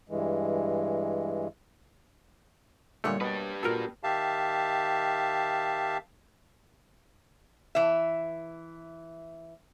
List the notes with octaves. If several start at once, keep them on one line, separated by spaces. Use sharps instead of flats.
G2 E3 G#3
A#2 D3 G3 A3 A#3 C#5
B2 G4 B4
A#2 F4 F#4 A4 A#4
D#3 G4 E5 F5 A5
E3 E5